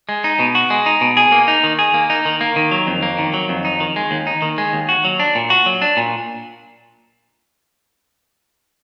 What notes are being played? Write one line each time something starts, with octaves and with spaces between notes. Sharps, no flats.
G#3
D#4
B2
F#4
G#3
D#4
B2
G#4
A#3
D#4
D#3
G#4
A#3
D#4
D#3
A#3
D#3
F#3
F2
A#3
D#3
F#3
F2
D#4
D#3
G#3
D#2
D#4
D#3
G#3
D#2
F#4
F#3
D4
A#2
F#4
F#3
D4
A#2